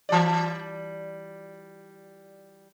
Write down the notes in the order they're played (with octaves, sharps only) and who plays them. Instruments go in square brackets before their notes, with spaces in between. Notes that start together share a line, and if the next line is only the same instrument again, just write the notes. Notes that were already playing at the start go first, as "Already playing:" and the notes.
[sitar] E3 G3 D5